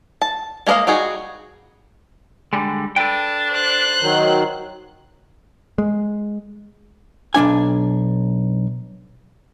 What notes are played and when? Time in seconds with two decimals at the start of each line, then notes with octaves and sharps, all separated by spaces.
0.22 A5
0.67 G#3 A#3 A#4 D#5 F5
0.87 G3 D#4 F#4 G#4
2.53 D3 G3 G#3
2.96 D4 A4 B4 G5
3.52 C5 F#6
4.02 D#3 F#3
5.78 G#3
7.34 B1 C#3 D4 G#5